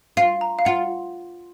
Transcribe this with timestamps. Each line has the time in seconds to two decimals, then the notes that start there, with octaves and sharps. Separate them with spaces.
0.17 F4 F5
0.41 A#5
0.59 F5
0.65 F4 F#5